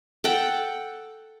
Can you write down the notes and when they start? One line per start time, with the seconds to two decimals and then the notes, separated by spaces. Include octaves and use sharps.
0.24 A4 F#5 G5